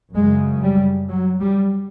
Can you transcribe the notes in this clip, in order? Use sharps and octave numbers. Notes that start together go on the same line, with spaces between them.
F#2 C#3 G#3
G3
F#3
G3